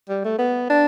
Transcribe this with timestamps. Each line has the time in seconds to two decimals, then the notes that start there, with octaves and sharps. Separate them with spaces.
0.09 G3
0.25 A3
0.39 B3
0.70 D4